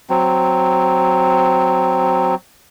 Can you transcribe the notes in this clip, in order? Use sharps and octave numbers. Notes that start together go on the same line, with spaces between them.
F#3 C4